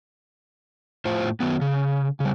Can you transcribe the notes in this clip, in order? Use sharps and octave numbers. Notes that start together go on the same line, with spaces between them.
A2 F4 C5
D#3 F#3 B3
C#3
C#3 G3